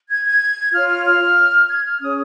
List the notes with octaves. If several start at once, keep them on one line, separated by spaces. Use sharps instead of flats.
G#6
G#6
F4 C#5 F6
F6
F6
G#6
F6
C#4 G#4 C#5 D#6